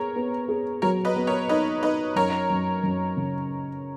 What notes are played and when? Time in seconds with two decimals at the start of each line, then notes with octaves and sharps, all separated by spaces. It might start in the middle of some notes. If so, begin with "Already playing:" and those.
Already playing: B3 G#4 A#4 C#5
0.16 B3
0.48 G#4
0.82 F#3 A#4 C#5
1.05 B4 D#5
1.16 B3
1.27 A#4 C#5
1.49 D#4 B4 D#5
1.82 D#4 B4 D#5
2.16 F#2 A#4 C#5
2.50 F#2
2.83 F#2
3.17 C#3